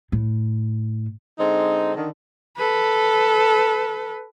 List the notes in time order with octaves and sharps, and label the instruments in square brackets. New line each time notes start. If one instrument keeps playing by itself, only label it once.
[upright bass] A2
[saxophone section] D3 G#3 C4 D#4
D3 D#3
[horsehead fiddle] A4 B4